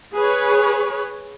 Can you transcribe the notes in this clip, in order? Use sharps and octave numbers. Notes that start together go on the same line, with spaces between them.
G#4 B4 C#5